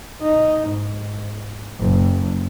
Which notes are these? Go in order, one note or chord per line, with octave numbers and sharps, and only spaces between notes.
D#4
G#2
F#1